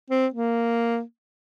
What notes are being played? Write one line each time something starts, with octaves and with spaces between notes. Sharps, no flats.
C4
A#3